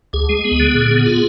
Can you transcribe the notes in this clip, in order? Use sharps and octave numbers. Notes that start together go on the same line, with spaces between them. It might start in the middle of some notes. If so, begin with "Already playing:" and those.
D2 G#4
G#3
B3
D3
A#2
B3
F4